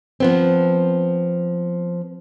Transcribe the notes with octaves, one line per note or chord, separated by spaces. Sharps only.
F3 B3 C4